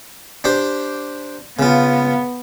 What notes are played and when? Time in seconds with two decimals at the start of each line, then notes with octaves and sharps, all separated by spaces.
0.44 D4 G4 C5
1.59 C#3 B3 F4